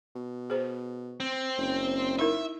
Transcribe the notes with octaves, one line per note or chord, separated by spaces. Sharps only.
B2
G#4 C5
C4
F#1
D#4 E4 A#4 E5